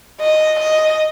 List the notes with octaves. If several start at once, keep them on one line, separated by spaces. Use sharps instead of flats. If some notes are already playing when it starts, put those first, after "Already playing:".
D#5
D#5